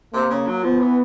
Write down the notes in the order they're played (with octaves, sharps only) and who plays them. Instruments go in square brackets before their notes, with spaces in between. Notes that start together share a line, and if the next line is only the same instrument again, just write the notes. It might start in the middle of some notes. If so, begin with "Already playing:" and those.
[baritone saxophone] C3 [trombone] A#3
[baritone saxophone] C#3
F#3
[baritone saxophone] F3 [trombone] B3
[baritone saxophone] E3